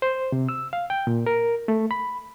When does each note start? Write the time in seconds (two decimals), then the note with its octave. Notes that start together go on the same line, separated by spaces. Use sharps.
0.02 C5
0.32 C3
0.49 E6
0.73 F5
0.90 G5
1.07 A#2
1.26 A#4
1.68 A3
1.91 B5